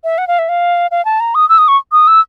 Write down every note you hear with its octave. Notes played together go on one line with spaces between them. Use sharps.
E5
F#5
F5
E5
F5
F5
A5
A#5
D#6
E6
D#6
C#6
D#6
E6